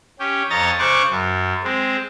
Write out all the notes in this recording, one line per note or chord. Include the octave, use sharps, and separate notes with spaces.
C#4 G4
F2 C#5 D#5 A#5 A6
C#3 C5 C#6 D6 F#6
F#2
G#3 C4